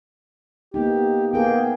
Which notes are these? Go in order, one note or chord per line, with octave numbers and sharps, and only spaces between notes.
A#3 B3 D#4 G4
A#3 B3 G#4 A#4 G5